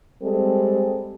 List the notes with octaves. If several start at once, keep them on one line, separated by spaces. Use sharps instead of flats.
G3 G#3 C4 A4